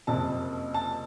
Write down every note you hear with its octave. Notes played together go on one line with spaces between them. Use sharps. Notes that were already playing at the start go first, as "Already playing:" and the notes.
F#1 F2 C3 A5
A5